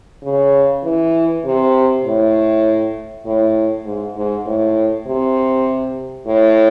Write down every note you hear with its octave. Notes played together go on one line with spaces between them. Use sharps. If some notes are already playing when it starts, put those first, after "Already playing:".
C#3
E3
C3
A2
A2
G#2
G#2
A2
C3
A2